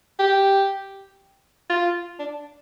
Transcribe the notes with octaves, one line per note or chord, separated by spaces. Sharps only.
G4
F4
D4